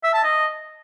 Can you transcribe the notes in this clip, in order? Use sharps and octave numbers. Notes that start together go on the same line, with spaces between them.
E5
A5
D#5